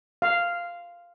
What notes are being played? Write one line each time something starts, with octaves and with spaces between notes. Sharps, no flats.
F5